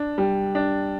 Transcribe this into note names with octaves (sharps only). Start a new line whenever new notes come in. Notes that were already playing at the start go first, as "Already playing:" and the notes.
Already playing: D4
G3
D4